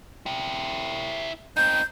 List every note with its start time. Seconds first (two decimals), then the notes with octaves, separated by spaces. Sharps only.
0.26 E4 G4
1.57 C4 D#4 G6